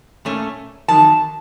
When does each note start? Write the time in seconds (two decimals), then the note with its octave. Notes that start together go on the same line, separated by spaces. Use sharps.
0.25 A#2 A3 C#4
0.88 F2 D#3 F#3 A5